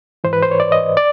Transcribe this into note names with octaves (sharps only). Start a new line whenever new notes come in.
G#2 E3 C5
B4
C5
C#5
D5
D#5
D5